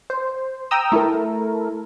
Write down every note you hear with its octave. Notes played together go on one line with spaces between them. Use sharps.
C5
G5 A#5 D#6 E6
A3 E4 A4 A#4